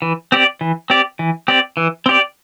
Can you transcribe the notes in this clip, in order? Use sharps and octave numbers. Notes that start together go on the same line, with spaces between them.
E3
C4 G4 D5
E3
C4 G4 D5
E3
C4 G4 D5
E3
C4 G4 D5